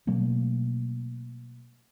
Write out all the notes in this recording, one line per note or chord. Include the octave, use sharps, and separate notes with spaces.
B2 F#3 A3 A#3